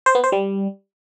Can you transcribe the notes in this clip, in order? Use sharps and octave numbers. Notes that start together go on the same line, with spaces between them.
C5
B3
C5
G3